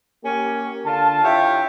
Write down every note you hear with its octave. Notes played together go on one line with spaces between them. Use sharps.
A#3 C#4 G4
D3 F4 A5
E4 F4 G4 C#5 E5 F5